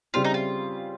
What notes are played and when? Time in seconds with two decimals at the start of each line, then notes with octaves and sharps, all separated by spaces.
0.14 C#3 G3 C4 F4
0.24 D#4
0.34 F4